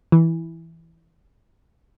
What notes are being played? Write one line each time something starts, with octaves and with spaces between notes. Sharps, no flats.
E3